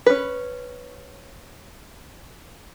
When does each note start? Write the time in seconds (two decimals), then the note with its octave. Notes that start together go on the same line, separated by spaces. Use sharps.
0.06 C#4 B4